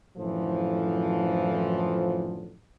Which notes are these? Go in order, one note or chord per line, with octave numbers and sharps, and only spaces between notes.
F#2 A2 D3 E3 F3